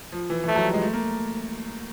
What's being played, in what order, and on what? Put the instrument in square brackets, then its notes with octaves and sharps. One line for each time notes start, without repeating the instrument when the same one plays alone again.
[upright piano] F3
E3
E3
[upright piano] F3 [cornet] A3
[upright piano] F#3
G3
G#3
A3
A#3